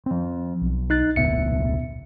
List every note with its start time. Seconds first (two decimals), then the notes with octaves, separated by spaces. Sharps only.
0.06 F3 C4
0.62 B1
0.90 D#4 F#6 A6
1.16 E1 C#2 A#2 B3 E5 C#7